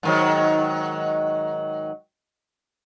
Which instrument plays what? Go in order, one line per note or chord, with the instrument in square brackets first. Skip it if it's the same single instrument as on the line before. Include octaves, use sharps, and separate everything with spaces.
[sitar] G#2 D#3 F#3